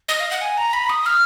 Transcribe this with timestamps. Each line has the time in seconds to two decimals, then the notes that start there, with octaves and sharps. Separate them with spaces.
0.09 D#5
0.20 F5
0.31 F#5
0.41 G#5
0.58 A#5
0.73 B5
0.89 D#6
1.06 F6